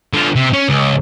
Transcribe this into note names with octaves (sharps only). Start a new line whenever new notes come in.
D3 F4
C3
C#4
C#2